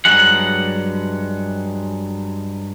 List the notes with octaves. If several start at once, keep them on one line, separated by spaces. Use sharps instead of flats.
G2 F#3 G#3 F#5